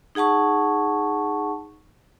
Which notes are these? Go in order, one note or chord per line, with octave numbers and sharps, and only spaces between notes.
D#4 G#4 F#5 A5 C#6